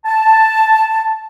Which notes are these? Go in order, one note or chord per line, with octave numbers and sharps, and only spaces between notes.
A5